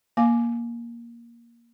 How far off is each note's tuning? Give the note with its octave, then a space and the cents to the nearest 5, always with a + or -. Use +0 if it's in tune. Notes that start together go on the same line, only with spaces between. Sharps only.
A#3 +10 F5 +0 D6 +0